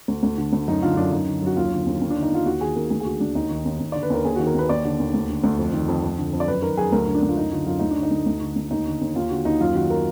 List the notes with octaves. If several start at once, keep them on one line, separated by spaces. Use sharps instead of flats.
D2
D2
D3
D2
F#2 D#4
D3 F4
F#2 D4
F#2 D#4
D3
F#2 F#4
D#2 F4
D3
D#2
D#2
D4
D3
D#4
D#2 F4
D#2 F#4
D#3 G#4
D#2 A#4
D2 G#4
G#4
D3 F#4
D2 D4
D#2 D#4
D#3
D#2
D#2
D3 D5
B4
D#2 A#4
D#2 G#4
F#4
D#3
A#4
D#2 B4
D#2 D5
D3
D#2
D2
D3
D2
F2
D#3
F2
F2
D3
F2
D5
F#2 B4
D#3 A#4
F#2 G#4
D2 A#4
D3
D4
D2
F4
F#2 D#4
D3 F4
F#2 F4
D2 D#4
D4
D3
D#4
D2
D2
D3
D2
D#2 D#4
D3
D#2
D#2 F4
D3 F#4
D#2 D#4
F#2 F4
D#3 F#4
A#4